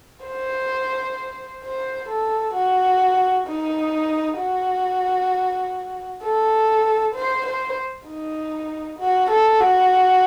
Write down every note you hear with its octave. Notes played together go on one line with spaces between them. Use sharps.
C5
C5
A4
F#4
D#4
F#4
A4
C5
C5
D#4
F#4
A4
F#4